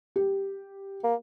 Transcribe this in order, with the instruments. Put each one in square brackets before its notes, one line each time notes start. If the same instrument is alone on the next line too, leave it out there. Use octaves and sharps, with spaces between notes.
[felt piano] G4
[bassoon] A#3